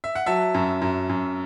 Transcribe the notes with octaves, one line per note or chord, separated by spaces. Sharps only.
E5
F#5
F#3 E5 A5
F#2
F#2
F#2